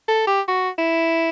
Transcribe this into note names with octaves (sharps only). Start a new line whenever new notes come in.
A4
G4
F#4
E4